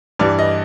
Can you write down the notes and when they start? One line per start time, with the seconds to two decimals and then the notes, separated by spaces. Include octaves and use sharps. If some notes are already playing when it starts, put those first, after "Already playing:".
0.19 G2 E3 G3 D5
0.39 D#5